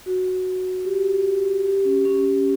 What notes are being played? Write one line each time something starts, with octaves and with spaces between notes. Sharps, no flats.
F#4
G4
G4
C#4
C#4
C#4